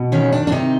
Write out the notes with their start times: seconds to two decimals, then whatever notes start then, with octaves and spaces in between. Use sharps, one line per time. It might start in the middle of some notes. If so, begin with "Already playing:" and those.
Already playing: B2
0.12 D#3 C#4
0.32 D4
0.47 D4
0.52 C3 D#4